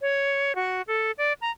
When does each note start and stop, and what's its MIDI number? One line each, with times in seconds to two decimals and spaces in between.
0.01 0.55 73
0.55 0.82 66
0.87 1.11 69
1.18 1.33 74
1.41 1.50 82